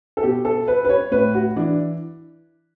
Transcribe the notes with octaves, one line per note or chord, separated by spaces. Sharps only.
A4
B2 G4
A4
B4
B4
C#5
A2 B4
F#4
E3 D4